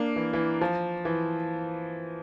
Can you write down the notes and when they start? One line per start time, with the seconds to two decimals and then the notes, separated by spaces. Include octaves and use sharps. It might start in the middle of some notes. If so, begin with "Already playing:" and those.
Already playing: A#3 D4
0.16 E3
0.33 E3
0.61 F3
1.05 E3